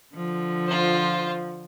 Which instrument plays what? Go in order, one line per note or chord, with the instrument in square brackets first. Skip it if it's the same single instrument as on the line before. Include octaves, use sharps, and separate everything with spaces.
[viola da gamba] D3 F3
[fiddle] F4 C5